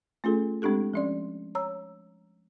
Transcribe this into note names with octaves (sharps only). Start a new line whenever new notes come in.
A3 C#4 F4 G#4 A4
G#3 C4 D4 G4 A4
F3 C#4 D5
C#5 A#5 E6